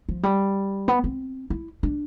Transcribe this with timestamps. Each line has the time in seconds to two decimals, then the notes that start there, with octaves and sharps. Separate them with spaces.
0.09 F3
0.23 G3
0.88 B3
1.04 C4
1.50 E4
1.83 D4